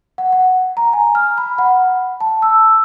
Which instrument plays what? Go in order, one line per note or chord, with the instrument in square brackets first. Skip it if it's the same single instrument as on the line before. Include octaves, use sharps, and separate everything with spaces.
[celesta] F#5
F#5
A#5
G#5
F6
B5
F#5
A5
E6